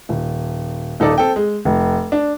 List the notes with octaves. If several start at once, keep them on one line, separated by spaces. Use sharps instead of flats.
D#1
D#1 D#4 A4 D5
C4 A4 C5 G5
G#3
F1
D4